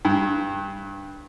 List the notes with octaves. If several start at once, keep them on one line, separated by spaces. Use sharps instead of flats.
G2